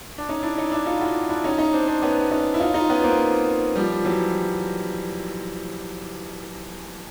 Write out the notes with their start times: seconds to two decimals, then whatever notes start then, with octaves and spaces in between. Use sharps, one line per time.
0.18 D4
0.29 C#4 D#4
0.43 D4 E4
0.57 C#4 D#4
0.72 D4 E4
0.86 D#4 F4
1.01 E4 F#4
1.29 D4 E4
1.44 C#4 D#4
1.58 C#4 D#4
1.73 C4 D4
1.88 C4 D4
2.02 B3 C#4
2.31 C#4 D#4
2.54 E4
2.60 D#4 F4
2.74 D#4 F4
2.90 B3 C#4
3.03 A#3 C4
3.76 F3 G3
4.05 E3 F#3